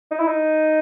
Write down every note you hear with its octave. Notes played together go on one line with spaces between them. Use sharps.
D#4
E4
D#4